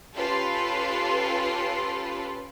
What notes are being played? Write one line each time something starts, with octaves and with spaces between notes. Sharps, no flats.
C#4 F4 G4 A4 B4 C6